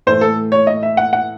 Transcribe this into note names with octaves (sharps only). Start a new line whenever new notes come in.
A2 E3 A3 C5
A4
C#5
D#5
E5
F#5
F#5